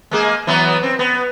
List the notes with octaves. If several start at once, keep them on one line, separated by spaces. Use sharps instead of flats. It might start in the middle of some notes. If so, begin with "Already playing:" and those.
G#3 A#3 G#4
E3 F#3 B3
C4
B3